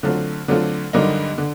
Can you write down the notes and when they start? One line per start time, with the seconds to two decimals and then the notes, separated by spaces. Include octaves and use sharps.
0.03 D3 F#3 A3 C4 F4
0.48 D3 F#3 A3 C4 F4
0.93 G2 D3 F#3 A#3 D#4
1.38 D3